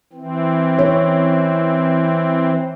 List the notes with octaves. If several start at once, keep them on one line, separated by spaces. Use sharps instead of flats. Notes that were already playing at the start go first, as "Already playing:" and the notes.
E3 C4
C#5